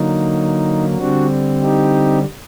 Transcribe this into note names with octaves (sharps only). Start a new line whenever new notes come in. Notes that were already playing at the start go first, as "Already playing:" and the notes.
Already playing: D3 F#3 A#3 D#4
D3 G3 C4 D4 F#4
D#4 G4